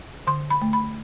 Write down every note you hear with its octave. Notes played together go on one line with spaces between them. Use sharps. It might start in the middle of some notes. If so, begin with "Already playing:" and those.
D3 C6
B5
A3
B5